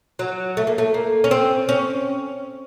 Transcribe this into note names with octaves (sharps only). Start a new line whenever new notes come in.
F#3
A3
A#3
A3
A#3
C#4
C4
C#4